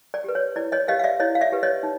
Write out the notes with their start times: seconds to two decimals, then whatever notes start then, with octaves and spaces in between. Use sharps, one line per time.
0.14 D5
0.24 G4 B4
0.35 C#5
0.56 E4 D5
0.72 C#5 D#5
0.87 G4 B4 D#5 F5
0.99 F5
1.04 D5 E5
1.20 E4 C#5 D#5
1.35 F5
1.41 D5 E5
1.52 G4 B4
1.63 C#5 D#5
1.83 D#4